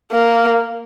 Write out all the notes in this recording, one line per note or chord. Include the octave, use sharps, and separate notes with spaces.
A#3